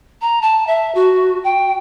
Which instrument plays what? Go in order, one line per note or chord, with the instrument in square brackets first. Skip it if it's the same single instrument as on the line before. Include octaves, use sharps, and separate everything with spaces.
[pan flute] A#5
A5
E5
F#4
G5